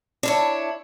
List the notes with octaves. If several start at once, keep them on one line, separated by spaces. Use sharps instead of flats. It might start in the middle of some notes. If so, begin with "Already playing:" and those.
D4 E4 C#5